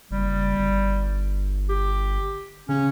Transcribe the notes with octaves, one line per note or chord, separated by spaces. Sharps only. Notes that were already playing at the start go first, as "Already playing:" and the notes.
F#1 G3
G1
G4
C#3 C#4